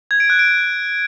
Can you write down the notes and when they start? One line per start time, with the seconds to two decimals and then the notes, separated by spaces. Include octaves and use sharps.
0.11 G#6
0.20 D7
0.30 F#6
0.39 D7